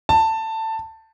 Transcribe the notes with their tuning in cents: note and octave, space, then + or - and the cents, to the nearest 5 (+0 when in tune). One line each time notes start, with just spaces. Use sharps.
A5 +15